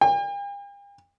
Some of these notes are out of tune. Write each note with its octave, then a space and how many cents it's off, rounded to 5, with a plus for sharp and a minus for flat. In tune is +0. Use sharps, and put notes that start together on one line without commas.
G5 +45